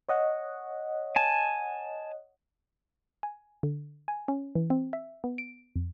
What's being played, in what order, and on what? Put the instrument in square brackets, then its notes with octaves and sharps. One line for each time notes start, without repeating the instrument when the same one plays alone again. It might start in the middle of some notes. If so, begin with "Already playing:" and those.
[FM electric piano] C#5 D#5 F#5
[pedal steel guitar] G#5 A5
[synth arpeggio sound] G#5
D3
G#5
C#4
E3
C4
E5
B3
D7
F2